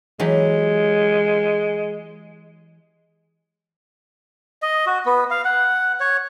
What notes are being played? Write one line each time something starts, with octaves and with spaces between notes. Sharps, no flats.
E3 F#3 G#3 G4
D#5
F#4
B3
F5
F#5
C#5